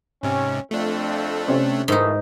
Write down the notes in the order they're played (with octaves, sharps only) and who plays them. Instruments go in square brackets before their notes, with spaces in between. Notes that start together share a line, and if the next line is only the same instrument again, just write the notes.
[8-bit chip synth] G#2 C3 [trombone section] C#4
[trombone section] F2 [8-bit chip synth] A3 D4
[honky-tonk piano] C3 C#4 C5
[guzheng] G#2 D#4 [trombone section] E3 F3 A3 [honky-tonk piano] A#4